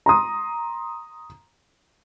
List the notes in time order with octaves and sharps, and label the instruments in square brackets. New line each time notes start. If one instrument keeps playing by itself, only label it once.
[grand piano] A#5 C6 D#6